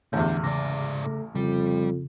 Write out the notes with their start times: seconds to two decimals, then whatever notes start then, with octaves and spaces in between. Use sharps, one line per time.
0.13 A1 E2 D3 G6
0.44 G#2 C#3 D5 D6 A#6
1.03 A3
1.35 F2 C#3 G3